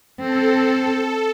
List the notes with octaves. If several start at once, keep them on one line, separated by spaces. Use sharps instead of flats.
C4 A4